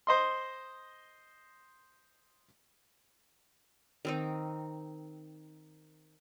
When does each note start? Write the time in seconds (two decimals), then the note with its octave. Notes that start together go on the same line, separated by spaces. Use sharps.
0.07 C5 D#5 C6
4.05 D#3 C4 D#4